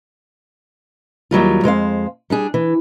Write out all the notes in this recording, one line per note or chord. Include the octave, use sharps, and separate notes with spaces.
D#2 F#3 G3 F4
F2 G#3 C5 F5
G3 D4 G#4
E3